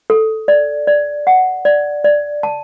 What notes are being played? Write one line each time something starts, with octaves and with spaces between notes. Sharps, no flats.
A4
D5
D5
F#5
D5
D5
A5